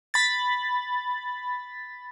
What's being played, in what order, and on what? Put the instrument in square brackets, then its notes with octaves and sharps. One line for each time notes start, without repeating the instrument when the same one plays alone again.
[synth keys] B5 A6